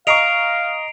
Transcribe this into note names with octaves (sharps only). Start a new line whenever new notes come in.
D#5 F5 A#5 C#6 C7 D7 F7